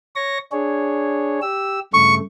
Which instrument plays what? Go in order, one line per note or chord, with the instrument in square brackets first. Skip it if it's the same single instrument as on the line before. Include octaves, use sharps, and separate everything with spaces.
[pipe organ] C#5 C#6 A#6
D4 G#4 C#5
G4 E6
[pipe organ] G2 C#3 A3 [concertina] C#6